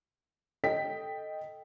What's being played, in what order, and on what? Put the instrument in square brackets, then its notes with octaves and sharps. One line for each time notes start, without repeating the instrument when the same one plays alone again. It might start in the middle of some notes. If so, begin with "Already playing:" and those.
[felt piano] A4 D#5 G5 B6